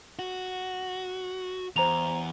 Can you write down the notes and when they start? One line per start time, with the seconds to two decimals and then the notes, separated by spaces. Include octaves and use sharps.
0.19 F#4
1.76 E2 C5 A#5 F7